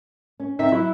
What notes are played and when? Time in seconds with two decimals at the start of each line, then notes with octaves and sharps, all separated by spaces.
0.40 C#4
0.59 D3 C4 D#4 E5
0.72 F#3 E4